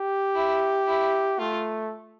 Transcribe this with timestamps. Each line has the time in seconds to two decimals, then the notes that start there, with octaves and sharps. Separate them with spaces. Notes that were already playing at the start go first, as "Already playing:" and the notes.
Already playing: G4
0.35 E4
0.87 E4
1.39 A3 F4